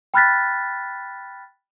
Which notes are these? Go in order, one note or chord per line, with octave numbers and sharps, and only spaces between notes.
G5 B5 F6 F#6 A6 B6